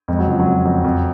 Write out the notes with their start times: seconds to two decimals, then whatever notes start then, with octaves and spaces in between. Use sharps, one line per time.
0.08 F2 G#3
0.19 F#3
0.27 C#3 F3
0.40 F#3
0.47 F2
0.65 F2
0.84 F2